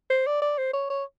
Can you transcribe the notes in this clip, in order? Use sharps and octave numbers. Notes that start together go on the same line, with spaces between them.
C5
D5
D5
C5
C#5
C#5